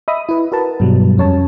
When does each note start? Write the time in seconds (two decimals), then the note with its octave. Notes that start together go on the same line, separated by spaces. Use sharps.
0.08 D#5 E5 B5 D#6
0.29 E4 B4
0.52 F#4 A#4 B4 A5
0.80 G2 B2 F#3 G3
1.17 F2 C#4 C#5 A5